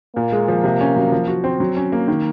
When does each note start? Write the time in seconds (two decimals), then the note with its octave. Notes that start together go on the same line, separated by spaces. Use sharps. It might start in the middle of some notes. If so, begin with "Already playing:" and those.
0.16 A#2 A#3
0.32 G#3
0.48 F3
0.64 C3
0.81 C#4
0.96 F#3
1.12 F3
1.28 F#4
1.44 C4
1.60 F#3
1.77 C#4
1.92 A#3
2.08 D#3